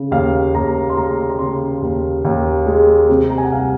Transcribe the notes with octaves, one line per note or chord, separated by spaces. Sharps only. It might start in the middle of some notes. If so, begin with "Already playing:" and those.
Already playing: C#3
D#2 F5
D#2 A#5
C6
G#3 A#5
A#5
C#3 C6
D#2
D#2
G#3
C3
A#5
G#5
F#5
C2 F5